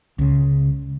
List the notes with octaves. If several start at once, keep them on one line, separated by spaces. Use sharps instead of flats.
C#2 C#3